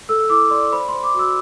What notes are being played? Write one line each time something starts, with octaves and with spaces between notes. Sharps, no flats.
A4 E6
E4 D6
D5 C6
C5 B5
C6
C5
D6
F#4
E6